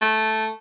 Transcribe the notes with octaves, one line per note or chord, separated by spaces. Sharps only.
A3